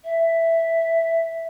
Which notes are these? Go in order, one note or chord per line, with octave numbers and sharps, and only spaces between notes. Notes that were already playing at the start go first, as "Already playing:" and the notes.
E5